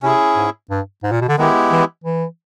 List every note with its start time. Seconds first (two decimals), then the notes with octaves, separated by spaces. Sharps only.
0.03 C3 C#4 E4 G#4
0.37 G#2
0.70 G2
1.04 G#2
1.12 A#2
1.21 B2
1.28 D3
1.37 D#3 G#3 B3 E4 G4
1.71 E3
2.04 E3